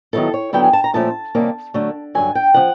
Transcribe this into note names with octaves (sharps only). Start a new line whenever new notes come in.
D#3 F#3 B3 E4 A4
C#5
D3 F#3 B3 E4 G5
G#5
A5
A#5
A#2 F3 A3 C#4 E4 A5
C3 D#3 G3 A#3 C#4
D3 F#3 A3
G2 D3 F#3 G#5
G5
C#3 F3 F#5